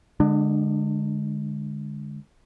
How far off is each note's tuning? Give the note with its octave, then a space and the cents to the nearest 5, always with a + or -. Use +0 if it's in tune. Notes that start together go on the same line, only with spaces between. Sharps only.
D3 +0 G#3 +0 D4 +30